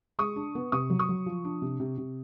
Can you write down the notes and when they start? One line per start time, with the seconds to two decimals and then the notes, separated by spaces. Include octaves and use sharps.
0.19 G#3 C#6 D#6
0.36 D4
0.55 B3
0.72 C3 C#6 D#6
0.90 F#3
0.99 C#6 D#6
1.09 F#3
1.26 F3
1.45 D4
1.62 C3
1.80 C3
1.98 C3